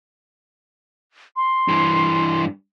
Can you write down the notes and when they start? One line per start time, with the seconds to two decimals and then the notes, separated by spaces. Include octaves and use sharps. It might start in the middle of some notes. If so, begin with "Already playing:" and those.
1.36 C6
1.68 G2 E3